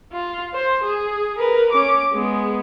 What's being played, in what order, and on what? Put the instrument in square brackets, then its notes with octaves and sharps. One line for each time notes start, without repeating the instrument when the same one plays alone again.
[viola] F4
C5
G#4
A#4 B4
C#4 D6
G#3 B3